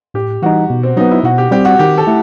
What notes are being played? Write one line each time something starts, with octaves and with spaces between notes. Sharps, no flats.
A2 G4
E3 G3 D#4 F#4
B2
C4
F#3 B3 D#4
E4
B2 F#4
G4
G3 C4 G4
F#4
D#3 G4
A4
A3 E4